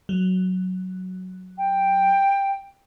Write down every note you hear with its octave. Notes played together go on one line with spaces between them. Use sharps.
F#3
G5